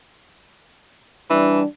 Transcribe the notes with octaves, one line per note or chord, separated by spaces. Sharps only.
E3 G3 D4